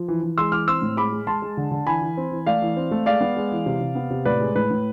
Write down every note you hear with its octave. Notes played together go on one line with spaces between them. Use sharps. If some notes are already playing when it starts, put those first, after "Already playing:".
Already playing: F3
E3
E3
G#3 C6 E6
E3 D6 F6
C4 C6 E6
A2
G#3 B5 D6
G#3
G#3 A5 C6
G#3
D3
D3
E3 G#5 B5
E3
C4
E3
A3 D5 F5
E3
C4
A3
G#3 D5 F5
B3
G#3
E3
C3
C3
B3
C3
A2 B4 D5
G#3
A2 B4
A2